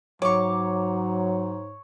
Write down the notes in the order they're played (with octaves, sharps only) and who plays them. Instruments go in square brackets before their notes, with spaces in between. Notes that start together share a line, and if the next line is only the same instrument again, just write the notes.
[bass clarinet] G#2 [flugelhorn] F#3 [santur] C#5 [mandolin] C#6 D6